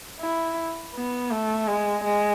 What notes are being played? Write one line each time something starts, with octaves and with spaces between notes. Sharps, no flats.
E4
B3
A3
G#3
G#3